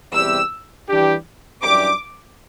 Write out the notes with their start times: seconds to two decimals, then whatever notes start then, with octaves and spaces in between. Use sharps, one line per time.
0.13 E2 C3 G3 C4 G4 E6
0.88 E3 G3 D4 G4
1.63 F#2 E3 G3 D4 G4 D6